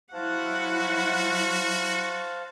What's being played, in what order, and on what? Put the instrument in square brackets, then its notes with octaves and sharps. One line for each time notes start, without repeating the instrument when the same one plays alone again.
[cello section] F#3 E4 [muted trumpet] F#4 [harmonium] C5 F5 A5 [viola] F#5